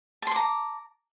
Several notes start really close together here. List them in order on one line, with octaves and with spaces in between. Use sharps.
A5 C6 D6 A#5